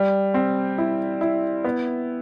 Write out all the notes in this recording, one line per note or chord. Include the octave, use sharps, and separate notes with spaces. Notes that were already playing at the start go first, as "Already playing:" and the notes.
Already playing: G3
C4
E4
E4
B3